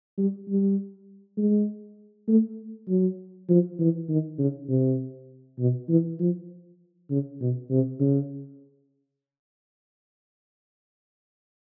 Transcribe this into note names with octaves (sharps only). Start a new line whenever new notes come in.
G3
G3
G#3
A3
F#3
F3
E3
D#3
C#3
C3
B2
E3
F3
C#3
B2
C3
C#3